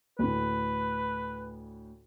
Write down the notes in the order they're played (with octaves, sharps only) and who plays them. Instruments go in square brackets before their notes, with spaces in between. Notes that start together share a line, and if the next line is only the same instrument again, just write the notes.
[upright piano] D2 A2 [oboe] B4